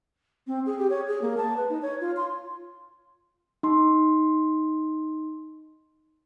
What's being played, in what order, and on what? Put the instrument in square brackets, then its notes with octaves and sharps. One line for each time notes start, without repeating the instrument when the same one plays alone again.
[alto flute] C4
G#4
G4
C#5
G#4
A#3
A5
B4
D#4
C#5
F4
C6
[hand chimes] D#4 C6